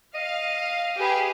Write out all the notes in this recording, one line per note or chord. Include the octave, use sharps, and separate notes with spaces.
D#5 F5
G4 G#4 B4